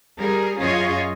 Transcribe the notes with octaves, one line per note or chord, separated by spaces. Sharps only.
G3 G#4 A#4
F#2 C#4 F4 G#4 C#5 D#5